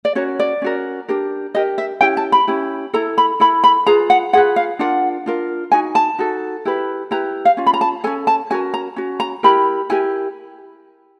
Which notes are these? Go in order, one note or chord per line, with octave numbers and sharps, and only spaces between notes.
D5
C#4 F#4 A#4 C#5
D5
C#4 F#4 A#4
D4 G4 A#4
D4 G4 A#4 D#5
E5
C#4 E4 G4 G5
A5
B5
C#4 E4 G4
E4 A4 A#5
B5
E4 A4 B5
B5
F4 G#4 B4 A#5
F#5
F4 G#4 B4 F#5
F5
D4 F4 A#4 F#5
D4 F4 A#4
D#4 F#4 G#5
A5
D#4 F#4 A4
E4 G4 B4
E4 G4 B4 A#5
F5
C#4 F4
B5
A#5
A5
C#4 F4 A4 G#5
A5
C#4 F#4 A#4 G#5
A#5
C#4 F#4
A#5
E4 G4 A#4 B5
E4 G4 A#4 G#5